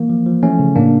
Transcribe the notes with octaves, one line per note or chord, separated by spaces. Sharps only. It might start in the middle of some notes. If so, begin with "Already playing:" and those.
Already playing: E3 A#3
F3
F3
E3 A3 C#4
C#3
A2 A#3 D4